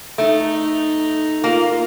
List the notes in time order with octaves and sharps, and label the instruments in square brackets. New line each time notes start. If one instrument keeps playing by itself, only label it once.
[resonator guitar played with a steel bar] A3 [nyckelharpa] D#4
[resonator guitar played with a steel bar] A#3 [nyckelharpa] F4